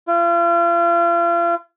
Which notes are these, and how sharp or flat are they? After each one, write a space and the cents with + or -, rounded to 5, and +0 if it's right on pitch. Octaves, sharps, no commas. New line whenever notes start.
F4 -40